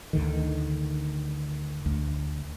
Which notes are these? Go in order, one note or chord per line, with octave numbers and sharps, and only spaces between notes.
D2 D3 D#3
D2